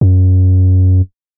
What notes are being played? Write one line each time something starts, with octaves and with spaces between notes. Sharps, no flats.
F#2